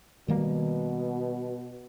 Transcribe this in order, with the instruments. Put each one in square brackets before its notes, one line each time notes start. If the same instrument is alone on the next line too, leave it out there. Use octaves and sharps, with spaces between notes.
[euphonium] B2 [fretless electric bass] D#3 G3 A#3